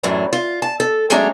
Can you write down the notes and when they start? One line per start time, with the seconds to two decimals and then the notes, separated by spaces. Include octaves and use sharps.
0.03 F#2 A2 E3 F#3 D4
0.33 F4
0.62 A5
0.80 A4
1.10 F#3 G#3 A3 C#4 D4 A#5